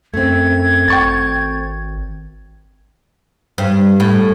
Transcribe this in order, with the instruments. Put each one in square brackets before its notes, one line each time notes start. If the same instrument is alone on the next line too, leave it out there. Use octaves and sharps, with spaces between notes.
[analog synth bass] F#2 [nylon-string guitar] A3 C4 [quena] G#6
[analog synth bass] G#1 [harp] G5 C#6 A6
[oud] G2
A2